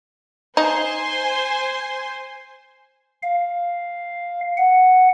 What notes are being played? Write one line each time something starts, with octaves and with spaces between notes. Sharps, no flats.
D#4 C5 G#5 C6
F5
F#5